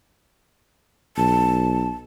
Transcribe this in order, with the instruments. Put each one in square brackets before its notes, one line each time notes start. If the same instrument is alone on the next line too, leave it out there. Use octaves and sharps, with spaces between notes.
[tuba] B1 [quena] A5